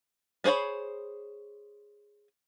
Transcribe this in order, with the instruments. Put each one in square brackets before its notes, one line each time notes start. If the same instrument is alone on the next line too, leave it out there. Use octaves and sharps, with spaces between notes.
[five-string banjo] G3 G#4 C5 C#5 B5